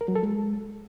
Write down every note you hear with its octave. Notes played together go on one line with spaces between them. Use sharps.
A#4
F#3
A4
G#3